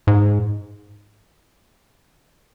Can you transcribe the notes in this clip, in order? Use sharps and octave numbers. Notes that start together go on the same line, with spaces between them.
G#2